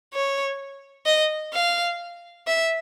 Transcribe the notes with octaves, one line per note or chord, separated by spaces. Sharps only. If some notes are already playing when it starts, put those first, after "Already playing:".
C#5
D#5
F5
E5